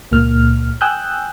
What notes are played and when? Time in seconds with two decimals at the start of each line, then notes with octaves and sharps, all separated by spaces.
0.12 C#2 A#2 A#3 F6
0.81 G5 G#5 D#6 E6 F#6 G6